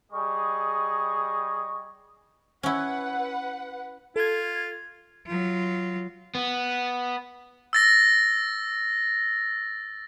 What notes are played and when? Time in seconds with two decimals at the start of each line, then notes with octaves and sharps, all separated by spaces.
0.12 G3 G#4 D#5 C#6
2.63 C#4 E4 B4 F#5
4.16 F4 A4 G#6
5.26 F#3 F4
6.35 B3
7.73 E6 A6 A#6